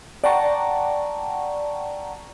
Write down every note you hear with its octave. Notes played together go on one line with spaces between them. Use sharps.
D5 F#5 G5 A5 A#5 C#6